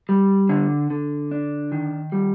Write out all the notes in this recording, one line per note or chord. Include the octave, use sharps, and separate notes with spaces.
G3
D3
D3
D4
D#3
G3